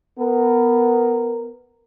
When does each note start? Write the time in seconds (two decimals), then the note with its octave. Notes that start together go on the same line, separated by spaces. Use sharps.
0.18 B3 A#4